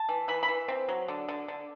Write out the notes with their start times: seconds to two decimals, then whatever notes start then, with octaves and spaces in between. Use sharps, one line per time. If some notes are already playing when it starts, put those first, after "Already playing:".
Already playing: A5
0.09 E3
0.28 E3 B5
0.43 B5
0.48 E3
0.68 C4
0.89 F#3
1.08 D3
1.28 D3
1.48 D3